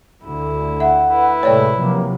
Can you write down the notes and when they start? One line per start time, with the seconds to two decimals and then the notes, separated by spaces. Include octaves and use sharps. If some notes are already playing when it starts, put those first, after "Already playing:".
0.25 D2 D3 E4
0.80 E5 F#5
1.11 E4 B4
1.43 A2 C3 G#3 A3 C#5 D5 G5
1.78 C3 F3 F#3 A#3